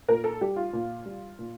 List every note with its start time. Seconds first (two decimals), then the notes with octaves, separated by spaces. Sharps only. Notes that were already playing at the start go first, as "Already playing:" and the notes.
0.08 A#2 A#4
0.24 A4
0.41 G3 G4
0.56 F4
0.73 A#2
1.06 G3
1.39 A#2